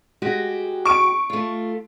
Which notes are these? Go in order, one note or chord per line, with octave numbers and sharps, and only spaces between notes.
G#3 F#4 G4
C#6 D7
A3 F4